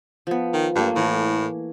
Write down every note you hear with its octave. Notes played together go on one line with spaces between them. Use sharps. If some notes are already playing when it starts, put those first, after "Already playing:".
F3 B3
D#3
G2 A3 A#3
A2 E3